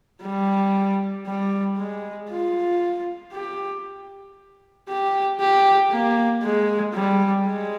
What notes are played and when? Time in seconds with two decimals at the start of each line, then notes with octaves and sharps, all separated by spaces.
0.22 G3
1.27 G3
1.77 G#3
2.29 F4
3.32 G4
4.88 G4
5.40 G4
5.91 A#3
6.43 G#3
6.94 G3
7.47 G#3